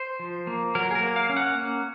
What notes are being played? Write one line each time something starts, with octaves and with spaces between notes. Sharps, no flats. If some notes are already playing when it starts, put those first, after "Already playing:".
Already playing: C5
F3
A#3
F#3 A#4
G#4
A#4
A#3
F5
C#4
F#5
A#3